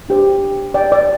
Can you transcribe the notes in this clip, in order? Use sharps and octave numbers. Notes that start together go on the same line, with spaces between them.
D4 G4 C5
D5 G5
D5